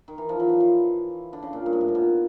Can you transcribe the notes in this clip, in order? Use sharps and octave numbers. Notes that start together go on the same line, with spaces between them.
D#3
E3
F3
E3 F#3
F3
E3
D3
C#3
A#2
G2
G#2
A2
A#2
B2